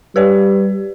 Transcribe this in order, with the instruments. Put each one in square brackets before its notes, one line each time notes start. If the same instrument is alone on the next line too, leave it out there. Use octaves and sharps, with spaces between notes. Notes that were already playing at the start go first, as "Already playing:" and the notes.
[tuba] G3 [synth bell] G4 B4 D5